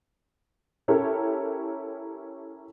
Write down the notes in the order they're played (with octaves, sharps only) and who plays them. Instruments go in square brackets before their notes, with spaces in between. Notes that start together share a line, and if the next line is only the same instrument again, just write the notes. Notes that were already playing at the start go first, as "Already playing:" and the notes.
[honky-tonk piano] C#4 E4 G4 A4 A#4 C#5